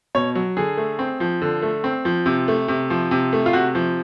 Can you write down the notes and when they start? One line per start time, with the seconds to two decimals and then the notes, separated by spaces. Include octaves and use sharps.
0.15 B2 C#5
0.35 F#3
0.57 D3 G#4
0.77 A3
0.99 C4
1.20 F3
1.42 D3
1.62 A3
1.84 C4
2.05 F3
2.26 C3
2.48 A3
2.68 C3
2.90 F3
3.11 C3
3.33 A3
3.46 F4
3.53 C3 F#4
3.75 F3